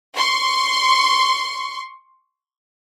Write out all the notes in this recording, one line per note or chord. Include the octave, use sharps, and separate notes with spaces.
C6 C#6